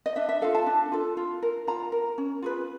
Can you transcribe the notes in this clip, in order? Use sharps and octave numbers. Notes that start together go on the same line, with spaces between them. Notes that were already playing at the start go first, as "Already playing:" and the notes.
D#5
D4 E5
E5
F4 A4 F5
A5
D4
F4 A4
F4
A#4
F4 A#5
A#4
C#4
F4 G#4 B4